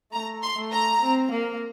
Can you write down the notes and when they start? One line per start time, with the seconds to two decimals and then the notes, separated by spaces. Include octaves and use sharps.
0.13 A3 A#5
0.43 C6
0.57 A3
0.72 A#5
1.01 C4
1.31 A#3